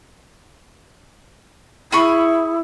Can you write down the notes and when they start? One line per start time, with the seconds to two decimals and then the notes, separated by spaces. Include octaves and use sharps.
1.92 E4 G#4 B5 C#6